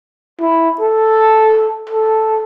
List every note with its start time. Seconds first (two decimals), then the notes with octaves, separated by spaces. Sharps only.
0.41 E4
0.81 A4
1.89 A4